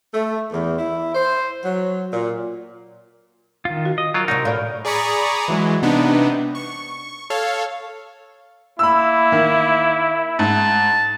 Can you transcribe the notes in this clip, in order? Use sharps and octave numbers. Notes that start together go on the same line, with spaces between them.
A3
E2
E4
C5
F#3
A#2
D#3 F4
F#4
D#5
F#3 F4 A#4
C3 D4 D#4 F#4 F#5
A2 D5 F5
G#4 D5 A#5 B5 C#6 D#6
E3 F#3 G#3
C3 B3 D4 D#4
C#6
A4 C#5 F5
A#3 E4 B5 E6
D#3
G#2 A5